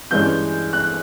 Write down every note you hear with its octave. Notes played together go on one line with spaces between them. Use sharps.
G2 E3 G#3 C#4 G6
F#6